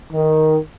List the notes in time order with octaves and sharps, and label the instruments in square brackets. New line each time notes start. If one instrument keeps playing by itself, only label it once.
[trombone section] D#3